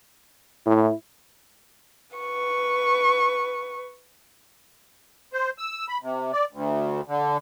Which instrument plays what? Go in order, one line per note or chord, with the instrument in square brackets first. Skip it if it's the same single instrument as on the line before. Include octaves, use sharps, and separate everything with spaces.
[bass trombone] A2 [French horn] E4
[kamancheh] B4 C#6
[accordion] C5
E6
B5
C3
D5
D2
D3